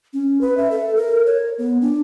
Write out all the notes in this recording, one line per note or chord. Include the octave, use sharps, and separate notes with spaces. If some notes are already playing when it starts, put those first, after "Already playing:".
C#4
B4
E5
A4
A#4
C#5
B3
D4